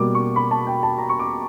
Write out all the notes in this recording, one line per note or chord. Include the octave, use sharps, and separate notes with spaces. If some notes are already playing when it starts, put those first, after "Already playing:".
Already playing: B2 G3 A#3 D6
C#6
B5
A5
G5
A5
A#5
C#6
D6